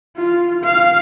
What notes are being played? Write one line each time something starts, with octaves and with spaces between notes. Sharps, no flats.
F4
F5